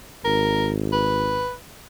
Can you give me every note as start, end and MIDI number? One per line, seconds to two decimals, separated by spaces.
0.25 1.58 32
0.25 0.69 70
0.92 1.54 71